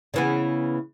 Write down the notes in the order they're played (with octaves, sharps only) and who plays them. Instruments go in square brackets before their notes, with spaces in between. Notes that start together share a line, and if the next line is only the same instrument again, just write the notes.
[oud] C#3 E3 B3